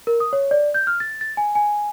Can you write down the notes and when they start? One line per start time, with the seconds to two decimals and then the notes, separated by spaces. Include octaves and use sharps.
0.07 A#4
0.20 D#6
0.33 C#5
0.51 D5
0.74 G6
0.87 F6
1.00 A6
1.21 A6
1.37 G#5
1.55 G#5